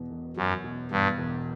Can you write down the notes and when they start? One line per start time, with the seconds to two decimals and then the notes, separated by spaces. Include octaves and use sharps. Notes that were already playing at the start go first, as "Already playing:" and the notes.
Already playing: E2 B2
0.11 E1
0.37 F#2 F#3
0.64 B2
0.91 E2 G2
1.18 E1